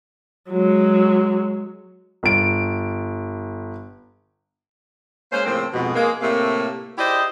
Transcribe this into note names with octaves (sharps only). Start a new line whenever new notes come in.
F#3 G#3
G1 D7
G#3 A#3 C#4 C5
A2 C#3 F3 A#3 C4
F2 G#2 B2
G#3 A#3
A2 C3 A3 A#3
E4 G4 G#4 C5 D5 D#5